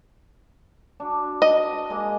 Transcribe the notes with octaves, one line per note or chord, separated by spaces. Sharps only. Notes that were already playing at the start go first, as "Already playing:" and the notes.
D4 F#4
D#5
G#3 A#3 A#4